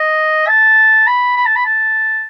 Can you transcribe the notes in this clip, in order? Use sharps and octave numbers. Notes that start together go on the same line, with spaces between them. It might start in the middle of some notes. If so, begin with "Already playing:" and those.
Already playing: D#5
A5
B5
B5
A5
B5
A5